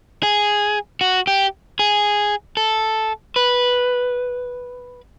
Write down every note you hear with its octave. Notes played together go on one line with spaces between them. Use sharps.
G#4
F#4
G4
G#4
A4
B4